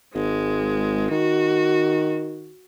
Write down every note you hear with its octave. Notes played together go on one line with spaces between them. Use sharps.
G#1 G#3
D#3 F#4